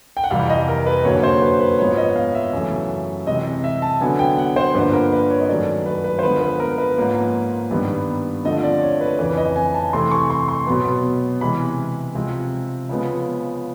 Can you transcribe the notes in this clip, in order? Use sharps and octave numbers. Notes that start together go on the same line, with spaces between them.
G5
F#5
F2 C3 E3 G3 F5
D#5
A#4
B4
F#2 D3 F#3 A#3 C#5
C5
B4
B4
G#2 F3 G#3 B3 C#5
D#5
F5
E5
F#2 C#3 E3 A3
C3 E3 G#3 C4 D#5
E5
A5
D3 F#3 B3 G#5
G5
F#5
C5
G2 D3 F3 A#3 B4
A#4
B4
C#5
D#5
F#2 D#3 F#3 A3 D5
B4
B4
C5
D3 F3 G#3 B3 B4
B4
A#4
B4
G#2 F3 A#3 C#4
G2 D#3 G3 B3
D3 F3 A3 C4 D#5
D5
C#5
B4
F2 C#3 E3 B4
D#5
G#5
A5
C3 E3 A3 C4 C6
C#6
C6
C6
B2 F#3 B3
C3 E3 G#3 B5
C3 F3 G#3 C4
C#3 F3 G#3 B3